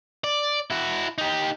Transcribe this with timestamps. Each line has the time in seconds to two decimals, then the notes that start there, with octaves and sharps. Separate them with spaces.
0.24 D5
0.70 E4 F#4
1.18 D#4 G4